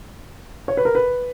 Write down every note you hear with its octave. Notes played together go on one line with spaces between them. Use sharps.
C#5
B4
A#4
B4